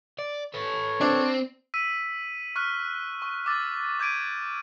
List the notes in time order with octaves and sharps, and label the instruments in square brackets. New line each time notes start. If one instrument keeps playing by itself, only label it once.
[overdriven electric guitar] D5
[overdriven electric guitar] A4 B4 [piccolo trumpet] C#5
[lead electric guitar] C4 [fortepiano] D4
[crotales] E6 B6 D#7
C#6 F6 F#6 B6
C#6
D6 E6 A6
D6 G6 G#6 D7 D#7